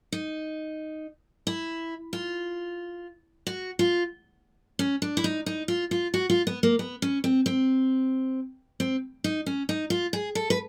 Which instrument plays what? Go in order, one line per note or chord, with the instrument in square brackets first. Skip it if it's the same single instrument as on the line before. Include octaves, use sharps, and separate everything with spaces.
[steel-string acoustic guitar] D#4
E4
F4
F#4
F4
C#4
D4
E4
D#4
D#4
F4
F4
F#4
F4
B3
A#3
B3
C#4
C4
C4
C4
D#4
C#4
D#4
F4
G#4
A4
B4